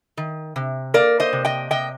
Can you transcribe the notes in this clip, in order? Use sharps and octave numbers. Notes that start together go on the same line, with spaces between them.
D#3
C3
A#3 A#4 D5
C5 D#5
C3
D#5 G5
C3 D#5 G5